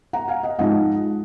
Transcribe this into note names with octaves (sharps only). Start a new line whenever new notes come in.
F#5 A#5
F5 G#5
D#5 F#5
G#2 F3 G#3 D#4 D#5 F#5